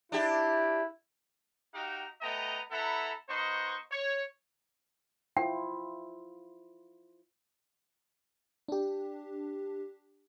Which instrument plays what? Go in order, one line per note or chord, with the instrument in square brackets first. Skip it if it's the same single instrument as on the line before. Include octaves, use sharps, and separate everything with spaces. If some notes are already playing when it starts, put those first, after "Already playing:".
[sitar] D4 G4 [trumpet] E4
[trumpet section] D#4 F#4 G4 F5 G5 A#5
A3 B3 D#5 G5 A#5
B3 E4 A4 F#5 A#5 B5
B3 D#4 C5 D#5 C#6
C#5
[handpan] E4 F4 C5 [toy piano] G5
[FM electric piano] D4 G4